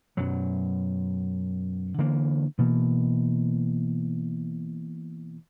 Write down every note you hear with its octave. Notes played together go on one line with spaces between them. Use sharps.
F#2 B2 F#3
D3 E3 A#3
B2 E3 A#3